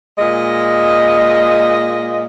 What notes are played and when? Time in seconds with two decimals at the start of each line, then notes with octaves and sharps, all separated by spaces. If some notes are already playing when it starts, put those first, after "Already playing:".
0.19 A#2 G#3 D#5